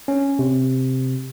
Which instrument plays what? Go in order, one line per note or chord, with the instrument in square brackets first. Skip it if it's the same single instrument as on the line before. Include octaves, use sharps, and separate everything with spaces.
[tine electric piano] C#4
C3